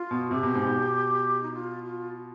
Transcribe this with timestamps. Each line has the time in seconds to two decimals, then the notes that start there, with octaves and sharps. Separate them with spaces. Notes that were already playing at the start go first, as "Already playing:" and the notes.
Already playing: F4
0.11 B2
0.31 C3 G4
0.43 B2
0.55 G#2
0.67 B2
1.43 D#4
1.53 F4
1.84 F4
2.14 F4